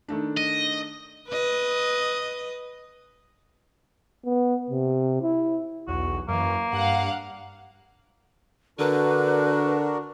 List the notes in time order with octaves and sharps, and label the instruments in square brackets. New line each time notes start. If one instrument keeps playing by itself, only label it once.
[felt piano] D#3 A3 D4
[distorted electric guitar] D#5
[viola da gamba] B4 D#5
[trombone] B3
C3
E4
[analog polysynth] B1 E2 [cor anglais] F#4
[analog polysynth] F#2 E3 [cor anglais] A#3
[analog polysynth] G2 [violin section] F5 F#5
[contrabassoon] D3 [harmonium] D4 F#4 A#4 [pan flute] B4